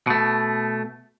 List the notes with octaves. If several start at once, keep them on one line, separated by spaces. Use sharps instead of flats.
B2 A3